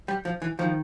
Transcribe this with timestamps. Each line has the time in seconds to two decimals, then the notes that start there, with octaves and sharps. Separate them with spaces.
0.08 G3
0.25 F3
0.42 E3
0.59 D#3 F3